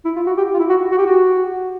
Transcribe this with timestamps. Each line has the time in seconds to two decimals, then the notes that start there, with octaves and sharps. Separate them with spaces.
0.05 E4
0.16 F4
0.26 F#4
0.37 G4
0.54 F4
0.59 E4
0.69 F#4
0.92 F#4
0.98 G4
1.06 F#4